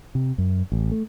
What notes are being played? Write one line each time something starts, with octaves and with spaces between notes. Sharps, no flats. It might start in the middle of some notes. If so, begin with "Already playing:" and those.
C3
F#2
A1
A3